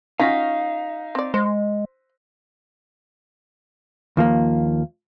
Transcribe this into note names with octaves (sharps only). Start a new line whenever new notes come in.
C#4 D#4 F4 F#4 F5 A#6 B6
C4 D5
G#3 C5
D#2 F3 A#3